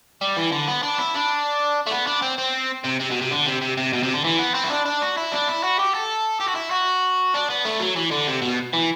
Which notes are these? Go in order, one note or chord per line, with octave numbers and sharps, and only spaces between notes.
G3
E3
D3
B3
D4
E4
D4
A3
B3
D4
C4
C4
C3
C3
B2
C3
D3
C3
C3
C3
B2
C3
D3
E3
B3
C4
E4
D4
D4
F#4
E4
D4
E4
F#4
G4
A4
G4
F#4
E4
F#4
D4
B3
A3
F#3
E3
D3
C3
B2
E3